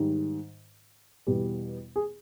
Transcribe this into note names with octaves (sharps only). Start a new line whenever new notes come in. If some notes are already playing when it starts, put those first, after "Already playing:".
Already playing: G#2 D#3 G3
E2 B2 G3
G#4